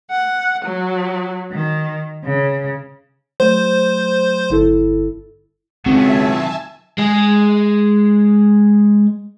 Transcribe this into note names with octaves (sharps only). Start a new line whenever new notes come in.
F#5
F#3
D#3
C#3
F#3 A3 C5
G1 E4 A4
C#2 D#3 F#3 C4 E5 G#5 A5
G#3 G#4